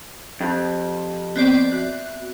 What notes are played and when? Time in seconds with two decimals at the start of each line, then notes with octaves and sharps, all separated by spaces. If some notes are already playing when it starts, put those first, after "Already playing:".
0.41 F2 G4 A5
1.36 B3 C4 D5
1.72 F#4 E5 F#6